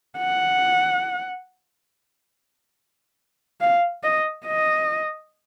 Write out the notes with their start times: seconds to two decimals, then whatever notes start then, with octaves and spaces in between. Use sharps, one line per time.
0.18 F#5
3.61 F5
4.03 D#5
4.46 D#5